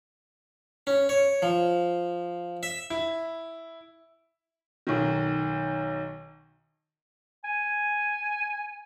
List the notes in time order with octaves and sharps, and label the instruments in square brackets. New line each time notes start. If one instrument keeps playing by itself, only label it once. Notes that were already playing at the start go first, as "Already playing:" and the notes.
[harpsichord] C#4
C#5
F3
E5
[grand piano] E4
[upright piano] B1 D#3
[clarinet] G#5